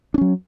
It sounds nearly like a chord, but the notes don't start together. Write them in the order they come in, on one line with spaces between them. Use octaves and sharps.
D4 C#4 F#3